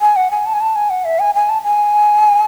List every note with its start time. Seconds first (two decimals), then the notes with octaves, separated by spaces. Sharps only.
0.01 G#5
0.16 F#5
0.31 G#5
0.46 A5
0.54 G#5
0.61 A5
0.75 G#5
0.90 F#5
1.05 E5
1.19 G#5
1.35 G#5
1.49 A5
1.64 G#5